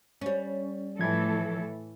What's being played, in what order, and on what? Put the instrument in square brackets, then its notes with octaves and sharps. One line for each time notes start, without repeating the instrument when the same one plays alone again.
[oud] G3 C#4
[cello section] A2 E3 A4 [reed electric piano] F3 G#6